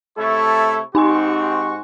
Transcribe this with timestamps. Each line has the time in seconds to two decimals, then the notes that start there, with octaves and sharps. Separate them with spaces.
0.18 C3 A3 E4 A4 C#5 C#6
0.95 G#2 C4 D#4 F#4 G4 G#5 C6 C#6